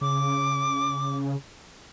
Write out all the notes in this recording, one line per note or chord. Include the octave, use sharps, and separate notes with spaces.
C#3 D6